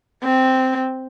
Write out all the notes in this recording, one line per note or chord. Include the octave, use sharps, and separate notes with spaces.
C4